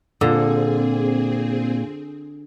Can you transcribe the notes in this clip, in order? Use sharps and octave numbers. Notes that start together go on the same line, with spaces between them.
A#2 D3 C4 G#4